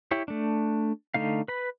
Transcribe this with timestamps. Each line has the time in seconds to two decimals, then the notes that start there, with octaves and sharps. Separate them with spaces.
0.11 E4 G4 C#5
0.28 A3 D4
1.14 D3 A3 D#4 F5
1.48 B4 B5